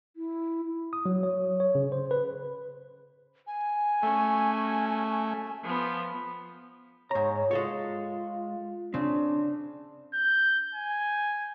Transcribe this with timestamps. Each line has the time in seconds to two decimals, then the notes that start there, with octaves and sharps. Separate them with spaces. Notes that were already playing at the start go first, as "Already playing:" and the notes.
0.16 E4
0.93 D#6
1.06 F#3
1.23 C#5
1.60 C#5
1.75 C#3
1.92 C5
2.11 B4
3.47 G#5
4.03 A3 C#4 F#4
5.63 F3 B3
7.11 G#2 C#5 A#5
7.51 G#3 F4 A4 C#5
8.94 C#3 C4 D4
10.14 G6
10.75 G#5